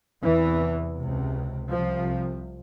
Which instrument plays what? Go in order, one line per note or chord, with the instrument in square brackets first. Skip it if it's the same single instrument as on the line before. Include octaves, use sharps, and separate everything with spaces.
[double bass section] E2 C3 E3
C#2 C3
C2 C3 F3